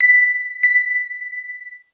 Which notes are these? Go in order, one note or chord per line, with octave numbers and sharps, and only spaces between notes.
B6
B6